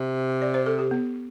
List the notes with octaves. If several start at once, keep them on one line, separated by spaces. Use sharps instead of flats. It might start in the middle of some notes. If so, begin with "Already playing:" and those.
Already playing: C3
D5
C5
A4
G4
B3